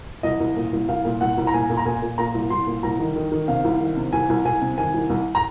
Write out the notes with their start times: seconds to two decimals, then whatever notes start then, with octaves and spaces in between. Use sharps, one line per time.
0.23 C2 D#5
0.40 C2
0.57 A#2
0.72 C2
0.89 C2 F5
1.05 A#2
1.21 C2 F#5
1.38 C2
1.47 A#5
1.53 A#2 G#5
1.70 A#2
1.77 A#5
1.86 A#2 G#5
2.02 A#2
2.18 A#2 A#5
2.34 C2
2.50 C2 C6
2.67 A#2
2.83 C2 A#5
2.99 D#3
3.16 D#3
3.32 D#3
3.48 C3 F5
3.64 C2
3.81 D#3
3.96 C3
4.13 C2 G#5
4.29 C2
4.45 C2 G#5
4.62 C3
4.78 D#3 G#5
4.94 C2
5.10 C2
5.35 A#5